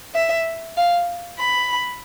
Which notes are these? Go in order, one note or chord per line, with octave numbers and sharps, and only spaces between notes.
E5
F5
B5